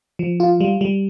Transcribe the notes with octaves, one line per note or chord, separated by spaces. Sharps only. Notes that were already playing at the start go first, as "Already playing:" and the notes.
F3
F4
G3
G3